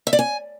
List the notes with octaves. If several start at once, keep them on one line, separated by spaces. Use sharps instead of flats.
E5
D5
G#5